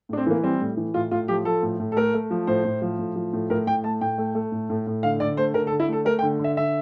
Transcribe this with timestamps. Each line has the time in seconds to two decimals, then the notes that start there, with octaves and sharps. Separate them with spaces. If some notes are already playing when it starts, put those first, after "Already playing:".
0.09 A2 D4
0.17 C4
0.26 E3 A#3
0.43 G3 C4
0.61 A2
0.77 E3
0.94 A2 F4
1.11 A2 F4
1.28 F3 G4
1.45 F3 A4
1.63 A2
1.80 A2
1.92 A4
1.97 A3 A#4
2.14 A3
2.31 F3
2.47 A2 C5
2.65 A2
2.82 F3
2.99 A2
3.16 F3
3.33 A2
3.50 A2 A#4
3.67 A2 G5
3.84 A3 A5
4.01 A2 G5
4.18 A3
4.35 A3
4.52 A2
4.70 A2
4.87 A2
5.03 D3 F5
5.20 D3 D5
5.37 A3 C5
5.54 D3 A#4
5.67 A4
5.71 D3
5.80 E4
5.88 A3 A4
6.05 A3 A#4
6.19 G5
6.22 D3
6.39 D3 E5
6.57 D3 E5